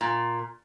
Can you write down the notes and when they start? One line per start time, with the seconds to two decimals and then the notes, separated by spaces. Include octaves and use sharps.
0.01 A#2